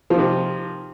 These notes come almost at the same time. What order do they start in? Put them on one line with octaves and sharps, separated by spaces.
F3 D#3 C3